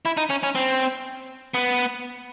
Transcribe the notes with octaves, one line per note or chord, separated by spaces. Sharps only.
E4
D#4
C#4
C#4
C4
B3